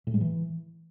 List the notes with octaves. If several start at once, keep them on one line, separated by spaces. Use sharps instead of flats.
A2
G#3
E3